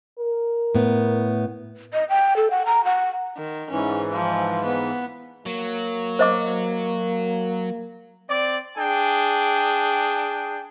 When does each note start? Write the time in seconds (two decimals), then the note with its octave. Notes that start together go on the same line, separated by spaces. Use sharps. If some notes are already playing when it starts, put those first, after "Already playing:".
0.19 A#4
0.75 A2 B3
1.93 D#5
2.09 G5
2.37 A4
2.51 F#5
2.66 A#5
2.84 F#5
3.37 D#3
3.70 G#2 E3 C#4
4.12 F3
4.65 B3
5.46 F#3 A#3
6.19 C5 D#5 D6
8.28 C4 D5
8.77 D4 G#4 G5